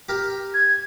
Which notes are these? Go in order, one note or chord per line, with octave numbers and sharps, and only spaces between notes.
G4 A#4 G5
G#6